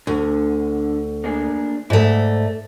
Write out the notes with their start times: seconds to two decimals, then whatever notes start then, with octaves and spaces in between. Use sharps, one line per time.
0.07 D2 D3
1.24 A#3 D4 G#4
1.90 G#2 A3 E4 D5 E5